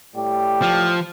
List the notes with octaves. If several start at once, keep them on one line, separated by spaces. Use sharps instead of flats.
A2 G3 G4
F3